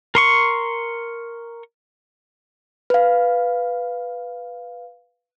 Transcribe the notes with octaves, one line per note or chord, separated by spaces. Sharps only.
A#4 C6 C#6
B4 F5